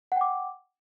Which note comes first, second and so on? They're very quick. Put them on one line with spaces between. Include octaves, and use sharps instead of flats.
F#5 G5 D6